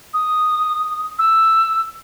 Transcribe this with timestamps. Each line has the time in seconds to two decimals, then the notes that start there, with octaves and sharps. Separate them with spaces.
0.14 D#6
1.19 E6